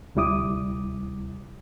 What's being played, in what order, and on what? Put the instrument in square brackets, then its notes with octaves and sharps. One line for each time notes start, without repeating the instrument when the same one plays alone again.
[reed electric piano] D2 C3 G3 E4 D6 D#6